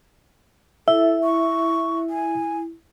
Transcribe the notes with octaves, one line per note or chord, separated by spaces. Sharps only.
E4 A4 E5
C#6
G#5